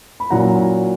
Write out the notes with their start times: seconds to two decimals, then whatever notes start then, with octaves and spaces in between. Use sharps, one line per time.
0.20 B5
0.31 A#2 F#3 C#4 E4 F#5 A#5